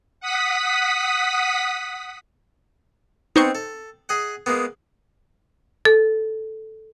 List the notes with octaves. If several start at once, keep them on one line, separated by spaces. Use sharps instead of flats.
F#5 D#6 B6
B3 C4 D#4 C5 C#6
A4
G#4 D#5 F#5
G#3 A#3 B3
A4